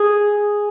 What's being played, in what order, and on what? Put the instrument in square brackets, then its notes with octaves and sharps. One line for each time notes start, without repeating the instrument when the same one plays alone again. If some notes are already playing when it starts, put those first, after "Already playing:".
Already playing: [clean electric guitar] G#4